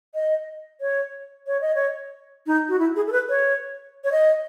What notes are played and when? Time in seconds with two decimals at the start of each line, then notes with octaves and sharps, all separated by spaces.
0.14 D#5
0.81 C#5
1.47 C#5
1.61 D#5
1.75 C#5
2.47 D#4
2.69 F#4
2.79 E4
2.96 G#4
3.07 A4
3.12 B4
3.29 C#5
4.04 C#5
4.12 D#5